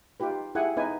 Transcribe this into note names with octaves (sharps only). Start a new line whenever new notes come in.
D#4 F4 G4 B4
E4 G4 G#4 F#5 G#5
B3 D#4 B4 G#5